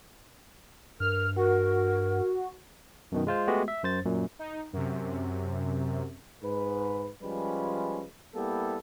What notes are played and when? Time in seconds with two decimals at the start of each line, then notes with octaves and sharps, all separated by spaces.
1.00 G2 A#4 F6
1.36 F#4 A#4
3.12 F#2 B2 D#3
3.27 G#3 F4 C5
3.47 G#3 A3 B3 F#4 G4
3.68 E5
3.83 F#2 C5 A6
4.05 F#2 A#2
4.39 D#4
4.73 F#2 C3
6.43 G#2 B4
7.22 F3 G3 G#3 C#4 F4 B4
8.35 G3 A#3 B3 E4 G4 A4